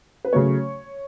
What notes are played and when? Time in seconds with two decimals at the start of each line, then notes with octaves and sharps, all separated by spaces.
0.25 B4
0.33 C#3 F#3 A3 C#5